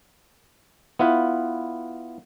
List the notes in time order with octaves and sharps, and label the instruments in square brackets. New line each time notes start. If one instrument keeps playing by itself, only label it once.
[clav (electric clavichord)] B3 E4 F4 B4